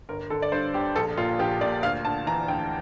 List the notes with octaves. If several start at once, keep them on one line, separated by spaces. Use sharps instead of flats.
G1 A#4
D3 A4
D5
G2 C5
G1 G4
A#1 A4
A#2 F4
A#1 G4
A#2 D5
D2 F5
D2 A5
E3 A#5
D2 G5